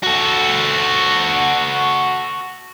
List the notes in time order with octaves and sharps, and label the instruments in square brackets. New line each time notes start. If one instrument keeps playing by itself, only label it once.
[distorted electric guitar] F#4 A4